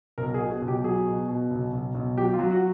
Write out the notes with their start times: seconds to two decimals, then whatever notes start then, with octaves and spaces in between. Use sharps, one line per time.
0.18 B1 A#4
0.34 G#4
0.40 B2
0.51 G#4
0.62 B1
0.68 G4
0.84 F#3 G#4
1.06 B2
1.28 B2
1.51 B1
1.73 B1
1.95 B1
2.17 F#3 G4
2.34 F4
2.39 F#3
2.51 F#4